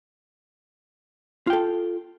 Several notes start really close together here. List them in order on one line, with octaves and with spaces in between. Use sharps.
F4 G5 A4